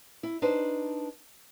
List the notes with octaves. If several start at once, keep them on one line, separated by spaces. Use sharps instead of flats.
E4
D4 D#4 B4 C5